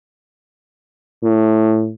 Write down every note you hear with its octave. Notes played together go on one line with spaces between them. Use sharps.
A2